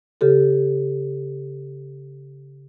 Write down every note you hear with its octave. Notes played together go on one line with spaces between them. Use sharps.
C#3 G4 A4